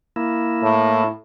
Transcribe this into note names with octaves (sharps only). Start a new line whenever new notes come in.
A#3 E4
A2